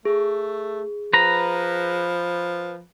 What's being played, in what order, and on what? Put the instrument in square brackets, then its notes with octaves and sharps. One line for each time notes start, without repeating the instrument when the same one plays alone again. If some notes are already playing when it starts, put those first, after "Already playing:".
[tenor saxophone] A3 [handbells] G#4
[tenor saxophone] F3 [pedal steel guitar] B4 A#5